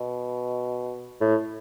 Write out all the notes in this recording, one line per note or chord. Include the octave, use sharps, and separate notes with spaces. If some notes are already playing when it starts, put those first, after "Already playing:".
Already playing: B2
A2